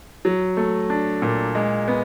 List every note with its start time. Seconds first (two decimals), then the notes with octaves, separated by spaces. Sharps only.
0.25 F#3
0.57 A3
0.90 D4
1.22 A#2
1.55 G#3
1.88 B3